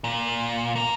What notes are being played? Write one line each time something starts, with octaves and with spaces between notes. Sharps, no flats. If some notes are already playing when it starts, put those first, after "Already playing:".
A#2
A#3 A#4